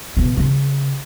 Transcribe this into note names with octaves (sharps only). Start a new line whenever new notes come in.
B2
C#3